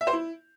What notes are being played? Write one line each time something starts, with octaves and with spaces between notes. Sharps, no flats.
E5
C5
E4